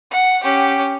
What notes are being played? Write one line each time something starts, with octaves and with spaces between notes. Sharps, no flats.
F#5
C#4 G4